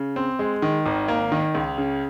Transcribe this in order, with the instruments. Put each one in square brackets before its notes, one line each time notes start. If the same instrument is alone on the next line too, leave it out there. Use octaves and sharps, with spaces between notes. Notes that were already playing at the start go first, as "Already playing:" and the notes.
Already playing: [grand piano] C#3
C4
G#3
D#3
G#1
A#3
D#3
C#2
C#3